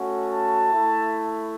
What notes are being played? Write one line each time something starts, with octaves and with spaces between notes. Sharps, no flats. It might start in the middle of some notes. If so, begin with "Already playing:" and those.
Already playing: A3 C#4 F#4
A5
A3 E4